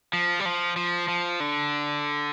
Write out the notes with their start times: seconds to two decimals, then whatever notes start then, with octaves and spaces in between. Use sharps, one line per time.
0.13 F3
0.40 G3
0.45 F3
0.76 F3
1.08 F3
1.40 D3